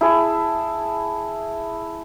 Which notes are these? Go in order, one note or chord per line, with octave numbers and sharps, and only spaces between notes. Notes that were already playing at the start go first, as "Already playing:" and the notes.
E4 G#4 A5